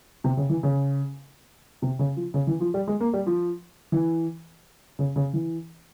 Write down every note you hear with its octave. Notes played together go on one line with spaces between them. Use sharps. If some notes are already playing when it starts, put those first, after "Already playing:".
C3
C#3
E3
C#3
C3
C#3
F3
C#3
E3
F3
G3
G#3
A#3
G3
F3
E3
C#3
C#3
E3